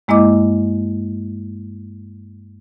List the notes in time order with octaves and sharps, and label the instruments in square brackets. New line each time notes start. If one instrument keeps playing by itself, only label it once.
[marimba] G2 G#3 A#3 E4 D#5 D6